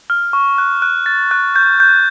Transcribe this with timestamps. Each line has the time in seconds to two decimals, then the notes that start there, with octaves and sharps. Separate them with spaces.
0.10 F6
0.33 C#6
0.58 F#6
0.82 F#6
1.06 A6
1.31 F#6
1.56 G6
1.80 G6